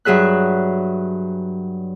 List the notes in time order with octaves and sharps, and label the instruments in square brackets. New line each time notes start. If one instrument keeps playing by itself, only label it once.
[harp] G2 F#3 G#4 E5 F#6